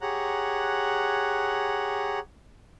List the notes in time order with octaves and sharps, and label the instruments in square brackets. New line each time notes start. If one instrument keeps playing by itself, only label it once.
[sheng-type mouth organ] G4 G#4 C#5 F#5 A#5 F#6